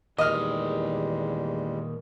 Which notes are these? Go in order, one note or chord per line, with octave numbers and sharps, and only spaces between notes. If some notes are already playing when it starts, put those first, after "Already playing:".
E2 A#2 D#3 G3 G#3 D#5 F6